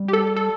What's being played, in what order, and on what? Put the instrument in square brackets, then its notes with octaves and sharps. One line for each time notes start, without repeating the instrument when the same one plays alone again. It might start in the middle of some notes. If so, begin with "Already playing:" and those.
Already playing: [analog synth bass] G3
[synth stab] G4
A4
A4